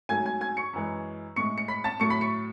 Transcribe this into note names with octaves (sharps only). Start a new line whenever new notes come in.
G#2 F#3 A3 G#5 G#6
G#5 G#6
G#5 G#6
C#6 C#7
F#2 E3 G#3
A2 G#3 C#6 C#7
C#7
B5 B6
A5 A6
A2 F#3 A3 C#6 C#7
B5 B6
C#6 C#7